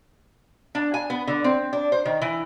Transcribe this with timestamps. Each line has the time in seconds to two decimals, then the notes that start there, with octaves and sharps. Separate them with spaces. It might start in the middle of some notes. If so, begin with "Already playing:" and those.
0.75 D4
0.94 G#5
1.10 B3
1.27 D3
1.44 C4
1.73 D4
1.92 C5
2.05 D#3
2.22 E3